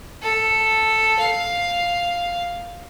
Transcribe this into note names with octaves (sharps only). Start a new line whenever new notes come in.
A4
F5